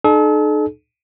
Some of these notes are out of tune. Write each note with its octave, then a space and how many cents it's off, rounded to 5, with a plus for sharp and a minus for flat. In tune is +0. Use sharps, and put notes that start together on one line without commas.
D#4 -45 A4 -40